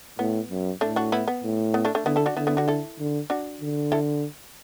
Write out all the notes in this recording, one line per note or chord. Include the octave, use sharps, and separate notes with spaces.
A2 B3
F#2
A2 A3 D4
D4 F#4
B3 E4
B3
A2
B3
A3 D4
A3 D4
D3 B3 E4
E4 A4
D4 F#4
D3 B3 E4
B3 E4
D4 F#4
E4 A4
D3
D4 F#4
D3
E4 A4